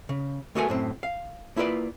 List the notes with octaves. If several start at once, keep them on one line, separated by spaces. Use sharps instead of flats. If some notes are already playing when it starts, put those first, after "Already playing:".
C#3
A3 B3 F#4 A4 A#4 G#5
F#2 A2 C4
F5
A#3 E4 F4 B4 D5